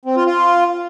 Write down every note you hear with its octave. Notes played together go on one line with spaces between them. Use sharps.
C4
F4
F4